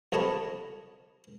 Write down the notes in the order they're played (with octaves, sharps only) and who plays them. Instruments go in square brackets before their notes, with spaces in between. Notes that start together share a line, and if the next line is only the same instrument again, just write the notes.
[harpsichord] C2 F2 C#5 D#5 A5 B5